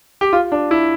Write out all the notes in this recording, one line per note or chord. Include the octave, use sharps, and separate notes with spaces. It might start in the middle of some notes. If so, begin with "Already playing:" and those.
G4
F4
D4
E4